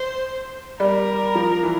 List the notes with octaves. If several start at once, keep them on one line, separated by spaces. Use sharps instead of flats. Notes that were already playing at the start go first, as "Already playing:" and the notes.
Already playing: C5
G3 A#4
F3
E3